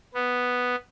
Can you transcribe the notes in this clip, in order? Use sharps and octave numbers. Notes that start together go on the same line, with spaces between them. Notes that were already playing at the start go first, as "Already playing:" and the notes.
B3